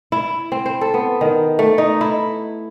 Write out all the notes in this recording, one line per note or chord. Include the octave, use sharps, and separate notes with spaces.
E4
C4
C5
A4
B3
D#3
A3
D#4
E4